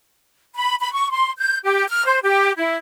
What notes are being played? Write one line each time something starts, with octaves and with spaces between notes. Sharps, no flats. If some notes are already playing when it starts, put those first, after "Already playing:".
B5
B5
C#6
C6
G6
G4
F6
C5
G4
E4